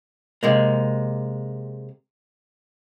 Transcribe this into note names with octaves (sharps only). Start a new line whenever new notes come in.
C3 G#3 A#3